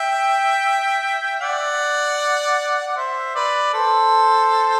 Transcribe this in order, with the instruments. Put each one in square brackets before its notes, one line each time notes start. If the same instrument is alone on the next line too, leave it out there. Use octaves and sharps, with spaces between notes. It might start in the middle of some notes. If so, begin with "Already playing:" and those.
Already playing: [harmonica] E5 G5
D5 F#5
F#5
C5 E5
B4 D5
A4 C5